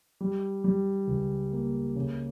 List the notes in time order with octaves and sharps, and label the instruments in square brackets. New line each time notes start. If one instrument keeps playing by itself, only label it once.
[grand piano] G3
G3
C#2
A#3
C#3